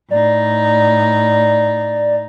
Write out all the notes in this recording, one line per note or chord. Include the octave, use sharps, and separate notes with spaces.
A2 D#4 D5